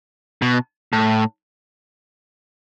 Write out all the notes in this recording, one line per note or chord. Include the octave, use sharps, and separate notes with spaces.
B2
A2